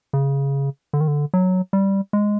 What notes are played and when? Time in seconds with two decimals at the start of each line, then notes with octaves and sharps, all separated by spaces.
0.13 C#3
0.93 D3
1.01 D#3
1.08 D3
1.34 F#3
1.73 G3
2.13 G#3